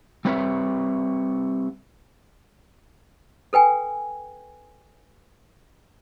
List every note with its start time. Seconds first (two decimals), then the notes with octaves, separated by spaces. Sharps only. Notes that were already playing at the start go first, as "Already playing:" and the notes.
0.25 G3 A3 C4 B4 C#5 E5
3.53 A4 B4 G5 G#5